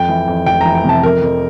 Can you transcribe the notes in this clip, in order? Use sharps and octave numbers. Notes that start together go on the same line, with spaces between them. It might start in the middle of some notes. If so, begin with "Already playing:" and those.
Already playing: F2 G5
E3
F2
F1 G5
E3 A#5
G5
C3 A5
F2 A#4
F2